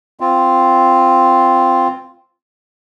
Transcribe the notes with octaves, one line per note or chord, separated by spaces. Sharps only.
C4 F4